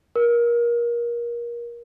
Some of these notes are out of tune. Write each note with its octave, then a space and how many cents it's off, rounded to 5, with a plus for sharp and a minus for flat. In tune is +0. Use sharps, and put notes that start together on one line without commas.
A#4 +25